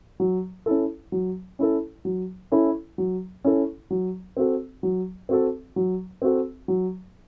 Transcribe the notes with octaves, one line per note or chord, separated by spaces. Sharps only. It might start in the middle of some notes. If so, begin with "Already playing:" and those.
F#3
C#4 E4 A4
F#3
C#4 E4 A4
F#3
C#4 E4 A4
F#3
C#4 E4 A4
F#3
C4 F#4 A4
F#3
C4 F#4 A4
F#3
C4 F#4 A4
F#3